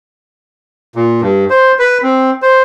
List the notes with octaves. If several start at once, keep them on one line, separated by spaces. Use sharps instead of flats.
A#2
G2
C5
B4
C4
C5